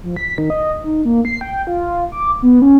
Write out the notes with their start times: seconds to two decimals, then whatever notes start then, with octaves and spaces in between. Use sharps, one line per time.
0.03 F3
0.16 B6
0.38 D#3
0.50 D#5
0.84 D#4
1.05 A#3
1.25 C7
1.41 G5
1.67 F4
2.12 D6
2.43 B3
2.62 C#4